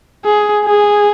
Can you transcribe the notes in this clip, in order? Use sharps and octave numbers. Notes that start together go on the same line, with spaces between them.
G#4
G#4